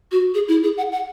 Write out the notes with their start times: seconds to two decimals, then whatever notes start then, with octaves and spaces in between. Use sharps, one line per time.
0.12 F#4
0.34 G#4
0.48 E4
0.64 G#4
0.77 F#5
0.92 F#5